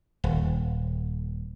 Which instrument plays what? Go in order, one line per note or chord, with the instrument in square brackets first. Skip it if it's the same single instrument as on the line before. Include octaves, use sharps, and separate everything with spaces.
[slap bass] D#1